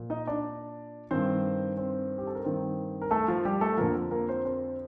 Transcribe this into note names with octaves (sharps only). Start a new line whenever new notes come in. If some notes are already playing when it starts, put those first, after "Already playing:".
Already playing: A#2 F3
D#4 D#5
D4 D5
G2 D#3 C4 C5
C4 C5
G4
A4
A#4
G2 D#3 C4 C5
A#4
A3 A4
F3 F4
G3 G4
A3 A4
F2 D3 F3 A#3 A#4
A#3 A#4
C4 C5
C4 C5